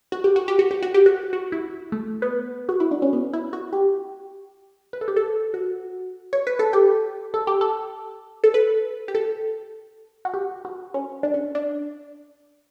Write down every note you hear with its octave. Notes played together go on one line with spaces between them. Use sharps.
F#4
G4
F#4
G4
F#4
G4
F#4
G4
F#4
F#4
E4
A3
B3
F#4
E4
D4
C#4
B3
E4
F#4
G4
B4
A4
G4
A4
F#4
C#5
B4
A4
G4
A4
G4
A4
A4
B4
G4
A4
F#4
G4
F#4
C#4
D4
C#4
D4